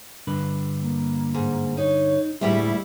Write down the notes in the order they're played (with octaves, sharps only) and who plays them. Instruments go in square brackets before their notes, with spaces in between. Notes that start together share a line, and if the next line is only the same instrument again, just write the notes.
[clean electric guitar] G2 D3 B4
[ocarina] A#3
[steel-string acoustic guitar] G#2
[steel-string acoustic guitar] D#4 [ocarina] C#5
[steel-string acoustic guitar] D2 G3 E4 [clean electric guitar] A2 G#3 [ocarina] E5